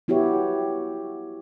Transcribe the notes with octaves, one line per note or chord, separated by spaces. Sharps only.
B3 E4 F#4 G4 C#5